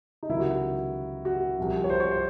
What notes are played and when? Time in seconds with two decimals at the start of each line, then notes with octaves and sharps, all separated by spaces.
0.23 D#4
0.29 C#2 C3 D#3 F#3 E4
0.40 F#4
1.25 F#4
1.58 C2 C3 F3
1.84 C#5
1.90 C5
2.00 C#5
2.11 C5